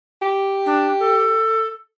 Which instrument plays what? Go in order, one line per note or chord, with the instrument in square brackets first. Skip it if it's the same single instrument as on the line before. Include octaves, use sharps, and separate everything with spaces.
[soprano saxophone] G4
[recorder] D4
A4